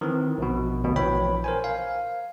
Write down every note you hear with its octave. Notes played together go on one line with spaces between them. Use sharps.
D#3 E3 C4
A#1 B2
D2 B2
A#1 E3 C#5 G5 B5
A#4 C5 G#5
F5